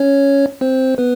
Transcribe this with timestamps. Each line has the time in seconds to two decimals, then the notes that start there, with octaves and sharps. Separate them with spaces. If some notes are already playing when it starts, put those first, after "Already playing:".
Already playing: C#4 C#5
0.61 C4 C5
0.98 B3 B4